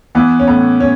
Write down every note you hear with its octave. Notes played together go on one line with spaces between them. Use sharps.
E3 B3
C#4
A2 B3
A2 C#4